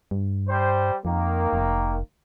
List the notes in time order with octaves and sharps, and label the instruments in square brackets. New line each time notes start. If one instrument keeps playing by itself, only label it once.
[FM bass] G2
[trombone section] G3 C5
[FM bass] F2 [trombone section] D#3 A#3
[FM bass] F1